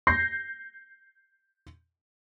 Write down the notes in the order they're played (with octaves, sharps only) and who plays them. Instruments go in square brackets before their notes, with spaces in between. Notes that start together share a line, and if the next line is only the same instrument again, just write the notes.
[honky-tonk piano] G6 A#6 C7